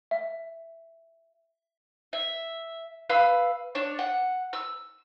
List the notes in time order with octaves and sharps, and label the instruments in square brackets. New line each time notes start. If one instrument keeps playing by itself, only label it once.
[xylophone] E5
[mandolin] E5
B4 F5 B5 E6
D4 C#5
F#5
E6